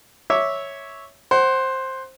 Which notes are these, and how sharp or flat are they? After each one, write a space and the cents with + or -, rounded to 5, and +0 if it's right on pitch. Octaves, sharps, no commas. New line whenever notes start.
C#5 +0 E5 -10 D6 +0
C5 +10 F#5 +30